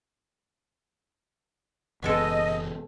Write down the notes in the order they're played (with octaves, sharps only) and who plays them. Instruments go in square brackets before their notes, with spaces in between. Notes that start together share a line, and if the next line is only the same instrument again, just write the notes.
[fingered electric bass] F#1 E3 C#4 [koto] B2 G#3 A4 [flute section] D#5